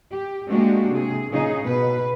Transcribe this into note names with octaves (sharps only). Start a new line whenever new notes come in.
G4
G#3 A#3 D4 F#4 G4
C3 G#4
A#2 C#3 D#4 G#4
B2 B4